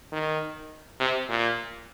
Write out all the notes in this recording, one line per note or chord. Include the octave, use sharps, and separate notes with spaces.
D#3
C3
A#2